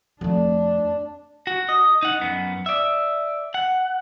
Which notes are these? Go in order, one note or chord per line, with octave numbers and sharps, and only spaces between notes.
F2 A3 D4
F#4
D#5
D#4 F#5
F#2 B3
D5 E5
F#5